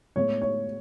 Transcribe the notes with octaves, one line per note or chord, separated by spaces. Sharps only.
A2 G#3 B3 C#5
C#5